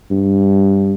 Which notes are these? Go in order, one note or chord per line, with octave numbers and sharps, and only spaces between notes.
G2